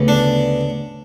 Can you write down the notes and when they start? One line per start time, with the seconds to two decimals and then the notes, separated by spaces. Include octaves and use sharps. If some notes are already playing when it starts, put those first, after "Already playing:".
Already playing: D2 C#3 B3
0.08 D4